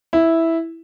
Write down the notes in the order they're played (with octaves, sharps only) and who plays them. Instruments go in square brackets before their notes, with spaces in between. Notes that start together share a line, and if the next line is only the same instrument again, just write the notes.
[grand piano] E4